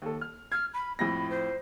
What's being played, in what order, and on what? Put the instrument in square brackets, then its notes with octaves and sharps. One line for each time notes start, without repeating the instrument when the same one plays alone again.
[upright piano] D#2 A4
F6
[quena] F6 [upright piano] G#6
[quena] B5
[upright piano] F2 A2 A#6 [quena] B5
[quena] C5